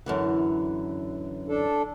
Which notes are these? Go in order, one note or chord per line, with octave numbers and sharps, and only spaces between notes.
F#2 D3 E3
D4 A4